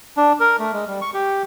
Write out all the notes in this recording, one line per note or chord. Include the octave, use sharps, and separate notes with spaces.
D4
A#4
A3
G#3
G3
C#6
G4